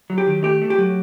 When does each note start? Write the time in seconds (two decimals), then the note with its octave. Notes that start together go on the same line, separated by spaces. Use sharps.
0.10 F#3
0.18 G4
0.27 D#3
0.43 A3 G4
0.62 A3
0.70 G4
0.78 F#3